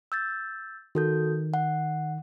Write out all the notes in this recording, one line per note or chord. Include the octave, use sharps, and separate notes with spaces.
E6 G6 A6
D#3 F#4 A4 G6
F#5